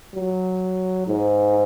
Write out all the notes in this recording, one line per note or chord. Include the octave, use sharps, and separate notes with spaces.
F#3
G#2